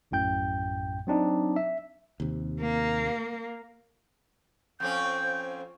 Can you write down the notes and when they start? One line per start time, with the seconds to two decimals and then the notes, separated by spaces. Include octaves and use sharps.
0.11 A#1 F#2 A2 G5 G6
1.07 F#3 C4 D4 D#4
1.56 E5
2.20 D#2 C3
2.61 A#3
4.80 F2 C4 C#4 G6